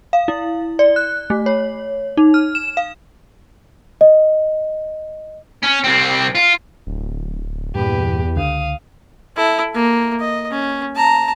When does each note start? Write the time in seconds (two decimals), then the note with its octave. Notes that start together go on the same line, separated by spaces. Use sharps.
0.13 F5
0.28 E4
0.79 D5
0.96 F#6
1.30 A3
1.46 C#5
2.17 D#4
2.34 F6
2.55 E7
2.77 F5
4.01 D#5
5.63 C#4
5.84 C2 C4
6.35 F4
6.87 D1
7.75 E2 G2 A#2 G4 B4
8.36 C#2 D3 F5 D#6
9.36 E4 A4
9.74 A#3
10.20 D#5
10.51 C#4
10.96 A5 A#5